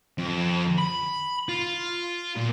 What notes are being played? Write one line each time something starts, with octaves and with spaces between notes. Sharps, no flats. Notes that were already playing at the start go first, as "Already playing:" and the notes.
F2
B5
F4
A#2